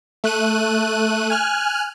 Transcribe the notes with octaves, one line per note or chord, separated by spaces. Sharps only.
A3 F#6 D#7
G#5 F6 F#6